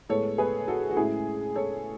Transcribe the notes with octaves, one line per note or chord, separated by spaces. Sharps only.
A2 G#3 B3 A4 C#5
G#4 B4
F#4 A4
F#4
A2 G#3 C#4 E4 G#4
A4 C#5